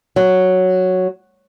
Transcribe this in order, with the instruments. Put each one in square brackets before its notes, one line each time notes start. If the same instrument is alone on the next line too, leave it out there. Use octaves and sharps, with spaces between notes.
[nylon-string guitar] F#3